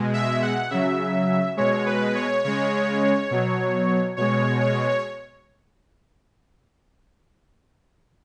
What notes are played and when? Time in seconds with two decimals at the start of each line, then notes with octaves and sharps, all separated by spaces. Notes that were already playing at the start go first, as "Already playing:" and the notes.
Already playing: B2 G#3
0.13 E5
0.42 F#5
0.70 C#3 F#3 E5
1.57 B2 G#3 C#5
1.86 B4
2.15 C#5
2.44 C#3 G#3 C#5
3.31 B2 F#3
4.17 B2 G#3 C#5
4.61 C#5